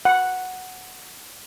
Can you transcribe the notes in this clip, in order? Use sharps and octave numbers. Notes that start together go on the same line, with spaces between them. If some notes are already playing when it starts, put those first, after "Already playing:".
F#5